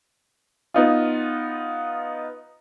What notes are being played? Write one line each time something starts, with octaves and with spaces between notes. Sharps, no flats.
B3 D#4 F4